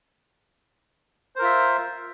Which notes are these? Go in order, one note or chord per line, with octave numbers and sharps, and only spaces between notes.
F4 A#4 C5 E5